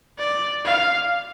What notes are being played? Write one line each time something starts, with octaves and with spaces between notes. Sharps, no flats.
D5
F5